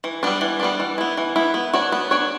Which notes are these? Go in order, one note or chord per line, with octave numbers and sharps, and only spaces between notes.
E3
G3 B3 D4
E3
G3 B3 D4
E3
B3 E4
E3
B3 E4
B3
D4 F#4 C#5
B3
D4 F#4 C#5